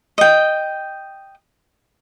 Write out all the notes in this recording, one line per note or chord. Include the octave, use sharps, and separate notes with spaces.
D#5 G5